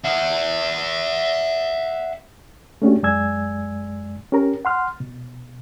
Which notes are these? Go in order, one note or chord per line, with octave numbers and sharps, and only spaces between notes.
E5 F#5
A3 A#3 C#4 D4 F#4 G4
F#2 G#3 D5 G#5 E6 G#6
C#4 G4 A#4 A#5
F#5 C6 F6
B2